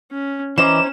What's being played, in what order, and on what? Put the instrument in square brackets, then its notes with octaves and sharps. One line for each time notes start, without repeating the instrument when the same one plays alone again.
[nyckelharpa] C#4
[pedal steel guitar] E3 D#5 D6 [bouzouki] C4 A#5 [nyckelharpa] C#4 [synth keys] E7